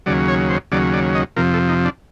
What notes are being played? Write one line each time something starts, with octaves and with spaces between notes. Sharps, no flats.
D#2 C#3 F#3 D5
C#5
C5
D#2 C#3 F#3 D5
D5
D#5
F2 C3 F3 A#4
A4
D#4
D4